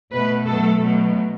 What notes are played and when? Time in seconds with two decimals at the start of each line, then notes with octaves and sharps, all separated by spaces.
0.11 B2 A3 B4
0.45 B2 F#3 A3 A4
0.80 B2 F#3 A3